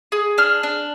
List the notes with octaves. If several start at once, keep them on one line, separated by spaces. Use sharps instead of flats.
G#4
D4 F6
D4